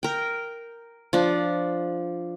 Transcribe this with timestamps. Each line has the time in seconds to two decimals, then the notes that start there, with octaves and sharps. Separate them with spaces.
0.03 A#4 G5
1.13 F3 D4